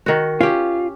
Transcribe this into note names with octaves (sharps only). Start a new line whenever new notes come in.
D#3 F#4
C#4 F4 G4